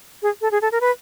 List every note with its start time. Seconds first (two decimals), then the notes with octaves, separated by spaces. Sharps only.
0.23 G#4
0.41 A4
0.51 G#4
0.62 A4
0.72 A#4
0.81 B4